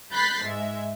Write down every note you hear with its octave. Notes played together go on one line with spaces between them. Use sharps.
B5 F#6 G6 A6 B6 C7
G#2 G#3 E5